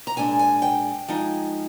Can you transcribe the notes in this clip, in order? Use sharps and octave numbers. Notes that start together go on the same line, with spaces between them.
A#5
A#2 G#3 D4 G#5
G#5
G5
F3 G#3 D#4